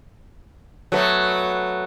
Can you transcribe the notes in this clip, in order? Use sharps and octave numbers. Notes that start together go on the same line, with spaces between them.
F#3 A3 B3